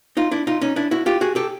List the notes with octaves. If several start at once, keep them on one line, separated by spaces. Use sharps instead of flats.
D#4 F4
D4 E4
D#4 F4
C#4 D#4
D4 E4
E4 F#4
F4 G4
F#4 G#4
G4 A4